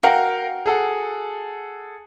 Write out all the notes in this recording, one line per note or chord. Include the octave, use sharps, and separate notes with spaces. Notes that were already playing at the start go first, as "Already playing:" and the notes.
F#4 A#4 F5 G5
G#4 A4 F#5